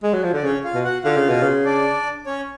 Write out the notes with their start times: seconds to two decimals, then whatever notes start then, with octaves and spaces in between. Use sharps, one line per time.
0.03 G#3
0.13 F#3
0.24 F3
0.33 D3 D5
0.43 C#3 C#4 C#5
0.64 F4 F5
0.74 B2
0.84 F#4 F#5
1.04 D3 F4 F5
1.17 C#3
1.29 B2
1.43 C#3
1.65 D4 D5
2.26 C#4 C#5